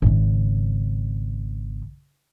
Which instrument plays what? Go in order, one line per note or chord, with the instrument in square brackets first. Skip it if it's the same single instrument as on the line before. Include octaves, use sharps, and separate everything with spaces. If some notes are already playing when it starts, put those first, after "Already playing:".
[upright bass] G#1 C#3